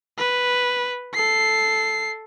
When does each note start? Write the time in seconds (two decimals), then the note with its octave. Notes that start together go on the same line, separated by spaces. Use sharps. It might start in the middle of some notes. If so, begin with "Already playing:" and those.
0.18 B4
1.14 A4 C7